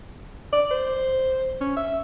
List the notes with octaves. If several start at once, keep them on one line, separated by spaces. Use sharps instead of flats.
D5
C5
C#4
E5